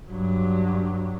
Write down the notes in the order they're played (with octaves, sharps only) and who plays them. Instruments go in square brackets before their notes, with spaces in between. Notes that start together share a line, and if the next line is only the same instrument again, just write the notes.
[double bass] G2 F#3